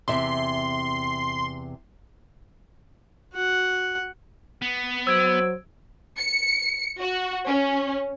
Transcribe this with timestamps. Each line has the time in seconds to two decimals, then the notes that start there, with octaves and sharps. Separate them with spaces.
0.08 E2 C3 E5 C6
3.33 F#4 F#5
4.62 B3
5.07 F#3 C5 E6 G#6 D7
6.18 C#7
7.00 F#4
7.46 C#4